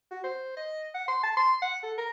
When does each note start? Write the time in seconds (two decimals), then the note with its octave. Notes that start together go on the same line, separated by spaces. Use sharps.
0.11 F#4
0.24 C5
0.57 D#5
0.95 F#5
1.08 C6
1.23 A5
1.37 C6
1.62 F#5
1.83 A4
1.98 A#4